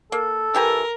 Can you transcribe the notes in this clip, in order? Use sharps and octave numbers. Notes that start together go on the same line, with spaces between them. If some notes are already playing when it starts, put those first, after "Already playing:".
A#3 A4
E3 G4 A#4 G#5